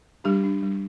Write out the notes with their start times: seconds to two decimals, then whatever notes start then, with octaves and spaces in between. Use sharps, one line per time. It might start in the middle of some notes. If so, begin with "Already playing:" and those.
0.24 G3 D4 G4
0.44 D4
0.63 G3